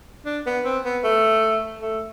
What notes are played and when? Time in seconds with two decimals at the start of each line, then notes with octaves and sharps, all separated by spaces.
0.26 D4
0.46 B3
0.65 C4
0.85 B3
1.04 A3
1.81 A3